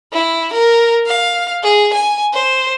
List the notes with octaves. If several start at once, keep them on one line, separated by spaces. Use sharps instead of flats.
E4
A#4
F5
G#4
G#5
C5